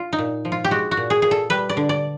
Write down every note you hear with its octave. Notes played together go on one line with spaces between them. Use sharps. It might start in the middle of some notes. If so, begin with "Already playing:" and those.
Already playing: F4
D#4
A#2
F3
F4
G4
G#3 F#4
F#4
A#2
G#4
A#2 G#4
A4
G3 B4
D5
D3
D5